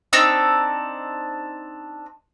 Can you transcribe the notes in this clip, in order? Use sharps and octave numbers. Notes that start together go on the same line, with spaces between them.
C4 D4 D#4 E6